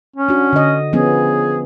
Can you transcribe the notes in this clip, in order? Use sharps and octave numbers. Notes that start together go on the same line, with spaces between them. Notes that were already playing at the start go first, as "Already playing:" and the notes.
C#4
D4 F#4
D3 D#5
F3 B3 C#4 G#4